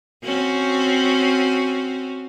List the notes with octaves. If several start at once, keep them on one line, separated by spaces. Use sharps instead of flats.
C4 C#4 F#4